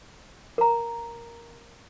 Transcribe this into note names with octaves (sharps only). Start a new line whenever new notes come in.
A#4 A#5